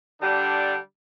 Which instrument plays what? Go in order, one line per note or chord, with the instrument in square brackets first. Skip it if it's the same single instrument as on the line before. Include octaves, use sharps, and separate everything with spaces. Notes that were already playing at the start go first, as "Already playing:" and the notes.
[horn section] D3 G3 D4